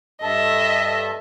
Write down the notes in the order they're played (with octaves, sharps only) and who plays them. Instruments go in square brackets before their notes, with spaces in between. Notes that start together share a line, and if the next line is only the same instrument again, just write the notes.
[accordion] G2 A4 [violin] D#5 E5